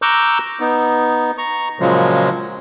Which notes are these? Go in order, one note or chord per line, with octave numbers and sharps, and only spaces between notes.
A#5 C#6 D6 E6 F#6 G6
B3 D#4
A#5 C#6
A#2 C#3 F3 F#3 G#3